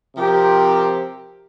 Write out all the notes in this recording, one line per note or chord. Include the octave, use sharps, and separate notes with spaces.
C3 F3 C4 G4 A#4